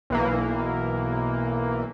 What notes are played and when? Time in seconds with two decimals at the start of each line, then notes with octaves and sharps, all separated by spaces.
0.10 B1 E3 A#3